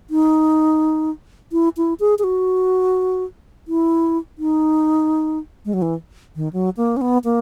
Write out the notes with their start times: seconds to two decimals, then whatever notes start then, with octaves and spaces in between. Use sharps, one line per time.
0.10 D#4
1.52 E4
1.77 E4
2.00 G#4
2.19 G#4
2.24 F#4
3.68 E4
4.38 D#4
5.65 G#3
5.73 F#3
5.82 E3
6.36 D#3
6.53 F#3
6.77 A#3
6.97 C#4
7.01 B3
7.24 A#3